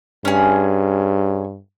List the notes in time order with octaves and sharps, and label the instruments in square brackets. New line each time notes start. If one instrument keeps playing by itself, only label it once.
[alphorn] G2 [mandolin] C#4 G#4